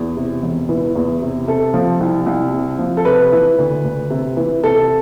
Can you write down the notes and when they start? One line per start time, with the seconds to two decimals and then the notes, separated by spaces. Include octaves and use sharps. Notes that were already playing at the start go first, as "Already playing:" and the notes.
Already playing: E2
0.17 C3
0.42 E1
0.69 E3
0.96 E2
1.22 C3
1.47 C3 A4
1.74 F3
2.00 C2
2.26 C2
2.53 C3
2.79 F3
2.97 A4
3.05 C3 B4
3.32 E3
3.58 D2
3.84 D2
4.10 C3
4.37 E3
4.63 C3 A4